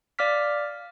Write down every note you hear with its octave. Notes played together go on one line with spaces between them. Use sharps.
D5 F5 D6 F6 B6